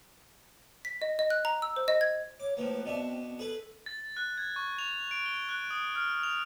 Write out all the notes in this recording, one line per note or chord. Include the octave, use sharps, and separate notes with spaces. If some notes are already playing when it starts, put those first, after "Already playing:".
B6
D#5
D#5
F#6
A#5
E6
C5
D#5
G#6
C#5 D6
A2 F3 A#3 B4
B2 C4 D4 E5
G#4 A4 B4
A6
F#6
G#6
C#6
F7
D7
G7
F#6
D#6
F6
F7